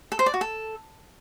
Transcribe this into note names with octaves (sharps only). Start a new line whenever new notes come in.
A4
C5
D5
F#4
A4